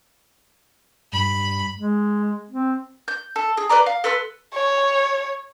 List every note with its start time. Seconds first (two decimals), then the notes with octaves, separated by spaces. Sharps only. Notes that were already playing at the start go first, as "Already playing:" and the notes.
1.12 G2 B5
1.76 G#3
2.51 C4
3.08 G6
3.36 A4
3.57 G#4
3.69 B4 C5 D5 A#5
3.86 F5
4.04 A4 B4 C6 E6
4.54 C#5